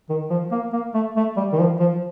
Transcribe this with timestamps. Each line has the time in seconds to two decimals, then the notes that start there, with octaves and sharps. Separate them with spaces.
0.10 D#3
0.30 F3
0.51 A#3
0.73 A#3
0.94 A3
1.16 A3
1.37 G3
1.52 D#3
1.58 F3
1.80 F3